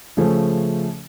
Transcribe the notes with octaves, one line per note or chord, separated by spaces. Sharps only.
C#3 F3 A3 C#4